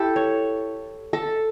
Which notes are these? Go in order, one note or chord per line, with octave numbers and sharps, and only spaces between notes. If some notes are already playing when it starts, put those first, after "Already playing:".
Already playing: E4 G4 A4
C#5
A4